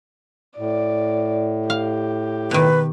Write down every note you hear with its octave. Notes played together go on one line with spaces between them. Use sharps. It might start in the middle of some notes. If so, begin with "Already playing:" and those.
A2 D5
G4 F5
B2 D#3 B4